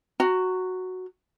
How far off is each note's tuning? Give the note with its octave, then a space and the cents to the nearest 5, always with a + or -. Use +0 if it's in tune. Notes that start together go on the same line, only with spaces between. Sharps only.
F#4 +0 A#5 -20